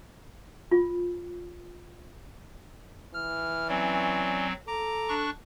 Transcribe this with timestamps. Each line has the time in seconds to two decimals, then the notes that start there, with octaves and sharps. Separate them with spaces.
0.71 F4
3.14 E3 F6
3.68 F#3 C4 C#4 D5
4.68 A4 A#5 D6
5.09 D4 C#6 F#6